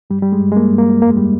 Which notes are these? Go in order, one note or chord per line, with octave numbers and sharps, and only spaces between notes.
G2 G3
G3
G#3
G2
G#3
A#3
G2
A#3
F2 A#3
G#3
G3